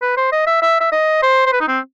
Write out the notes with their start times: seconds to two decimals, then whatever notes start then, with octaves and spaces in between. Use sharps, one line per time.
0.02 B4
0.17 C5
0.32 D#5
0.47 E5
0.62 E5
0.80 E5
0.92 D#5
1.22 C5
1.46 C5
1.52 B4
1.60 D#4
1.68 C4